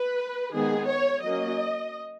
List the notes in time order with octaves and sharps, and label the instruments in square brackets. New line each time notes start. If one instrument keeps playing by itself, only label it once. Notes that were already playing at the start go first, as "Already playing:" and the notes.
Already playing: [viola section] B4
D#3 G#3 B3 G#4
C#5
F#3 A#3 C#4 D#5